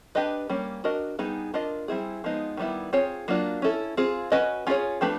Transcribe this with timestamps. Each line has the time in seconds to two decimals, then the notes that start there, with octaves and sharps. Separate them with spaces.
0.15 D4 G4 B4 D#5
0.49 G3 A#3 C#4
0.84 D4 F#4 A#4 D#5
1.19 G3 B3 D#4 G#4
1.54 D4 F4 A#4 D#5
1.88 G3 C4 E4 G#4
2.24 F3 G#3 B3 D#4
2.57 D#3 G3 B3 E4
2.93 C4 F4 G#4 C#5
3.28 F#3 A#3 D4 F4
3.62 C#4 E4 A4
3.97 C4 F4 G#4
4.32 C#4 F#4 B4 D#5
4.67 C#4 F4 G#4 C#5
5.01 F3 A3 D4 G4 B4